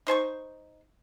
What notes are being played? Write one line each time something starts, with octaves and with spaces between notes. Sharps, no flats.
D#4 C5 G#5 C#6